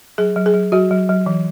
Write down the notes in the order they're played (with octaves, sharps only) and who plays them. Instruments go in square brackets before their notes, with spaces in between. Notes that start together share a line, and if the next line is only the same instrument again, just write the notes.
[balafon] F#3 G#4
F#3
G#4
F#3
F#3 F#4
F#3
F#3
E3